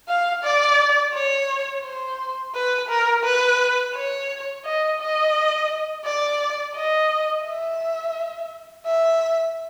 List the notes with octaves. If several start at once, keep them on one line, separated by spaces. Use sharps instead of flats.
F5
D5
C#5
C5
B4
A#4
B4
C#5
D#5
D#5
D5
D#5
E5
E5